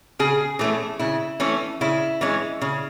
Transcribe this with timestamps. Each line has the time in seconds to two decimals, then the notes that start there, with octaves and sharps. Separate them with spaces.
0.19 C#3 G#4
0.59 E3 A3 C#4
0.99 C#3 E4
1.40 E3 A3 C#4
1.81 C#3 E4
2.21 E3 G#3 C#4
2.61 C#3